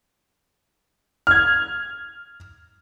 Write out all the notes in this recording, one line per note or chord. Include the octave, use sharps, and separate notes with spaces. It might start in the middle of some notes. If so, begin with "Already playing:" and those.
F6 G#6